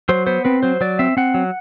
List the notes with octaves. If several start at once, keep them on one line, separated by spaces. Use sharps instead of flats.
F#3 C5
B3 C5
C4 B4
F#3 C5
F#3 D5
C4 E5
C4 F#5
F#3